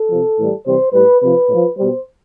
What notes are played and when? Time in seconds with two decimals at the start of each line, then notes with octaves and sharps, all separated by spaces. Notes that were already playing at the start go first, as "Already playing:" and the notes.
Already playing: A4
0.10 C3 F3
0.37 A2 E3 G3
0.65 C3 E3 G3 C5
0.93 A2 G3 B4
1.21 C3 F3 B4
1.49 A2
1.54 F3
1.77 B2 G3 C5